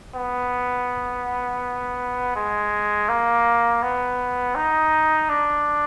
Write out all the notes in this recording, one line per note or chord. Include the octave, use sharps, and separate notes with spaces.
B3
G#3
A#3
B3
D#4
D4